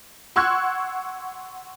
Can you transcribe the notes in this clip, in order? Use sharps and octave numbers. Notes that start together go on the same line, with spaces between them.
F#5 C6 C#6 E6 F#6 G#6